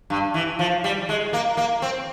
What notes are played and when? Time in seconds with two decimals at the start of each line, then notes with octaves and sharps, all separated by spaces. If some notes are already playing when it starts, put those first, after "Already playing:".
0.10 G2
0.34 E3
0.59 F3
0.84 G3
1.09 G#3
1.33 A#3
1.57 A#3
1.82 C4